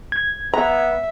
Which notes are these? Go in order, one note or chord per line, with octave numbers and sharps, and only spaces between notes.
G#6
B3 E5 A#5